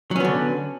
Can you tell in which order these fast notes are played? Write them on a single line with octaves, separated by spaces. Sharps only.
F#3 C#4 B3 D3